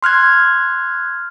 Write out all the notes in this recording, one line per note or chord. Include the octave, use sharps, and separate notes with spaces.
C6 F6 F#6 G#6